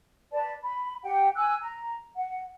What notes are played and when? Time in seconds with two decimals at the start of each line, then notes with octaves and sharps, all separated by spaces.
0.31 B4 D5 A5
0.63 B5
1.03 G4 F#5 G5
1.35 G#5 E6 F#6
1.60 A#5
2.15 F#5